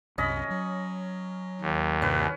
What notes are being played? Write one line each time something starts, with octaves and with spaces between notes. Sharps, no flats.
C2 F#2 C3 C#4 D#5 B5
F#3
D#2
G2 C3 C#4 B4